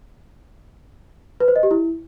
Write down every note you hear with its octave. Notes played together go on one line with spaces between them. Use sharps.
B4
C5
D#5
G4
E4